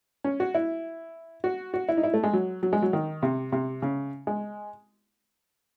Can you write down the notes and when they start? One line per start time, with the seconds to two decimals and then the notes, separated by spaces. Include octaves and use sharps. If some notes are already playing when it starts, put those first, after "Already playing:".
0.24 C#4
0.40 F#4
0.55 E4
1.44 F#4
1.74 F#4
1.89 E4
1.97 D#4
2.04 E4
2.14 A3
2.23 G#3
2.33 F#3
2.63 F#3
2.73 G#3
2.82 F#3
2.93 D#3
3.23 C3
3.52 C3
3.82 C#3
4.27 G#3